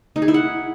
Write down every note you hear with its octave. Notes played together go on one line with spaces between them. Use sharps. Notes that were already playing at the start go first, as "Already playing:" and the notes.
D#4
G#4
E4
F#5